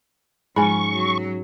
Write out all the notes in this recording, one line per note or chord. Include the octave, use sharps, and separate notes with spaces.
G#2 F3 C#4 G#5 B5 C#6
F#3